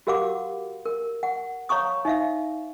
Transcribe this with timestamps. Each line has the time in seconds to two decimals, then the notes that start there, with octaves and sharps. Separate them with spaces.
0.07 F#4 G4 A#4 F5 F#5 D6
0.85 A#4
1.23 F#5
1.69 C#5 F5 A#5 C#6 D#6
2.05 D#4 E5 F5